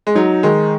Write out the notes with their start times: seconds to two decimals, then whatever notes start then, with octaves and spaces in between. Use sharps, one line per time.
0.07 G#3
0.15 F#3 D#4
0.43 D#3 G#3